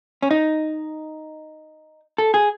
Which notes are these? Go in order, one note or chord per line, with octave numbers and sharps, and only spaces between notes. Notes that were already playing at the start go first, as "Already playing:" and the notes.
C#4
D#4
A4
G#4